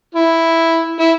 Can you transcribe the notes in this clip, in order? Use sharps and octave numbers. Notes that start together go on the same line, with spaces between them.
E4
E4